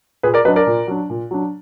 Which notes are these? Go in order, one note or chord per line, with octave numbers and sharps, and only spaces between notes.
A#2 G#4 B4
A#4 D5
F#3 D4 B4 D#5
A#4 D5
A#2
F#3 D4
A#2
F#3 D4